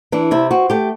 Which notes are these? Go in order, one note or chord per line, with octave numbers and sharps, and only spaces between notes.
E3 D4
C3 E4
C4 F#4
A3 G4